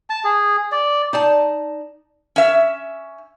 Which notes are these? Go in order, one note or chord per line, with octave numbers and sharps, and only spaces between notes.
A5
G#4
D5
D#4 D5 A5
C#4 E5